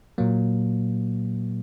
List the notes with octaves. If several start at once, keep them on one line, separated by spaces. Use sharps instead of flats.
A#2 F#3 A#3